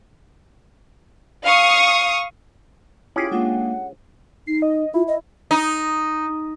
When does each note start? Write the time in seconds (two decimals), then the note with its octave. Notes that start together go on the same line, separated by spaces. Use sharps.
1.45 F5 C#6 D#6
3.16 C#4 E4 F4 G4 G#4 G#5 D7
3.31 G#3 A#3 D4 F4 F#5
4.47 D#4 C7
4.62 D#5
4.94 E4 F4
5.08 D#5
5.51 D#4